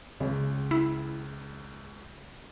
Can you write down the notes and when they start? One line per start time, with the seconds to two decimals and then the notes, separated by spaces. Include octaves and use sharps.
0.20 C#2 C#3
0.71 E4